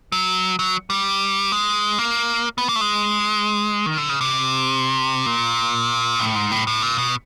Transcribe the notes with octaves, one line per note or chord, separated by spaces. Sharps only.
F#3
F#3
G3
G#3
A#3
B3
A#3
A3
G#3
D#3
D3
C#3
C3
A#2
A2
G#2
A2
A2
A#2
B2